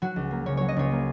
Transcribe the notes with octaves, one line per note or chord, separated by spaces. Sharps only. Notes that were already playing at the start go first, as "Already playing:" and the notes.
F#3 F#4
C#2
A#3
C#3 C#5
F#3 C#5
D#5
C#2 C#5
A#3